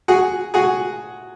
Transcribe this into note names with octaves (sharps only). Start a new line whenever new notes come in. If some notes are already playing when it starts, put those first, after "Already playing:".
F#4 G#4
F#4 G#4